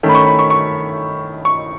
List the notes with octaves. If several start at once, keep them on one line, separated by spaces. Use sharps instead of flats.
D#3 A3 C#4
B5
C#6
B5
C#6
C#6
C#6